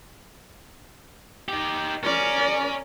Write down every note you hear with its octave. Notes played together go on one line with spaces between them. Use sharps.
D#4 G4
C#4 A#4 D5